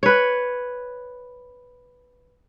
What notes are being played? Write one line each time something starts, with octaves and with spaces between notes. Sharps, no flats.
B4 C#5